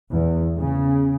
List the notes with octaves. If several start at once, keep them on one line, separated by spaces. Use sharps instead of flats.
E2
C#3